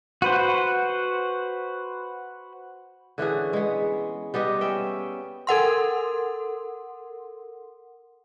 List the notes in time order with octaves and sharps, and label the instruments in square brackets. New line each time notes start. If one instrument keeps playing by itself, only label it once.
[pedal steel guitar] F#4 B4 C5
[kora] D3 E3 C#4 G#4
G#3 B3
G3 B3 G4 D#5
C#4 E5 G5
[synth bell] A4 A#4 F#5 C6